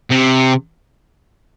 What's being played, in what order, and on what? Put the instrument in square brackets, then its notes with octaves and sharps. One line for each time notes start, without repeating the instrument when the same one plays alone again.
[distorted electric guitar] C3